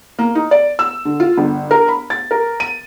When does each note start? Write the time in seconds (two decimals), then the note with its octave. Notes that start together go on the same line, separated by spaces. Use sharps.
0.19 A#3
0.35 D#4
0.51 D5
0.79 E6
1.05 D3
1.20 F4
1.38 G1
1.71 A#4
1.89 B5
2.10 A6
2.31 A#4
2.60 D#7